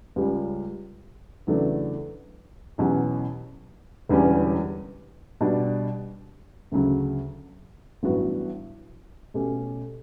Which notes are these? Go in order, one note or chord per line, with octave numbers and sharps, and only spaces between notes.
C#2 C#3 G3 C#4 G4
E2 C#3 F#3 A3 D4
E2 B2 F#3 C#4 G4
E1 E2 D3 G3 C#4
B2 G3 D4
D2 C#3 F#3
A1 G2 F#3 B3 F#4
B2 A3 C#4 G4